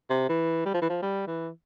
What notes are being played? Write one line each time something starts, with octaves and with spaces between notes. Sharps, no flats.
C3
E3
G3
F3
E3
F3
G3
E3